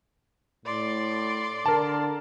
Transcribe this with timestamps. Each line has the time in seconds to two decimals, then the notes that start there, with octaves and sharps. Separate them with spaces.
0.65 A2 D5 C6
1.66 D3 A#4 A5